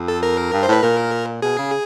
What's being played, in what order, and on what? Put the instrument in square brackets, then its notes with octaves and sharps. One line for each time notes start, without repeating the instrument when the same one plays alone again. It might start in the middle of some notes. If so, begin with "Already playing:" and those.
Already playing: [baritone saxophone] F2
[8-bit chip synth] A4
A#4
[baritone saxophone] G2
[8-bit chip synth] C5
[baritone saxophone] A2 [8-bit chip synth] B4
[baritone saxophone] A#2 [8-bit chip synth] A#4
[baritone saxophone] B2 [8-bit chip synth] G#4
[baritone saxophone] C#3